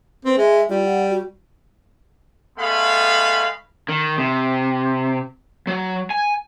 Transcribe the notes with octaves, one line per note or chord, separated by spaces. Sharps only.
C4 B4
G#3 E5
G3 F4
F#5
F#4
G#3 A3 B3 F5 B5
D#3
C3
F#3
G#5